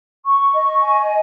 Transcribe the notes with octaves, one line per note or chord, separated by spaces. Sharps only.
C#6
D#5
G#5